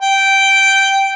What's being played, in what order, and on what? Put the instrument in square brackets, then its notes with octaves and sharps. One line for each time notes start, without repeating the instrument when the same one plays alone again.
[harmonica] G5